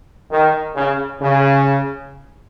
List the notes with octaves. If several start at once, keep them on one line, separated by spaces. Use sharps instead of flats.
D#3
C#3
C#3